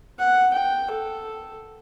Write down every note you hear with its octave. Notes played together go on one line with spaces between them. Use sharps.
F#5
G5
A4